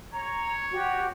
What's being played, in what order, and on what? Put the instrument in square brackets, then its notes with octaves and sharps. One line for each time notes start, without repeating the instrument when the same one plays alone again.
[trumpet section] C#5 [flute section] A#5
[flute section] F#4 G4